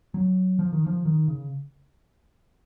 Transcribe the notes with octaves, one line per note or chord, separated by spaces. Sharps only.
F#3
F3
D#3
F3
D#3
C#3